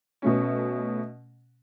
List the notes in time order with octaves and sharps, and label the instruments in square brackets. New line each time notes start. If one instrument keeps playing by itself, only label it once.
[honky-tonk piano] B2 A3 C#4